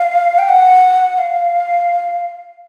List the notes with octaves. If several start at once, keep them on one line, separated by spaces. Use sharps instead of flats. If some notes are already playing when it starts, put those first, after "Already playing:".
Already playing: F5
G5
F#5
F5